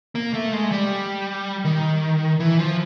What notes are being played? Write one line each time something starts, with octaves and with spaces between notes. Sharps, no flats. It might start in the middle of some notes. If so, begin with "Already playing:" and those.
A#3
A3
G#3
G3
D#3
E3
F3